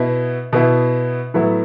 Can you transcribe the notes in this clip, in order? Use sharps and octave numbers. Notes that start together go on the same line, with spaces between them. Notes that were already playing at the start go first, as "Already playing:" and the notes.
Already playing: B2 B3 E4
B2 B3 E4
A2 F#3 B3 E4